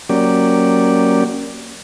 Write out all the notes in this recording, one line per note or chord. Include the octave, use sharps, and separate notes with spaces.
F#3 A#3 C#4 G4 D5